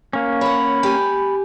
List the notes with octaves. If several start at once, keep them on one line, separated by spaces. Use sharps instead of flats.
A#3 C#4
C#5 F#5 B5
G4 G#5